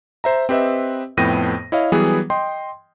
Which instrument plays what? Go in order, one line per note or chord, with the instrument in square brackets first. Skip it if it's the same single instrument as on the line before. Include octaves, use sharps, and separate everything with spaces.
[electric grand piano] C5 E5 A#5
C4 G4 B4 D#5 E5
F2 A2 B3 G5 A#6 D#7
E4 C#5 D#5 F5
E3 F#3 G3 B3 G#4
D#5 G5 C6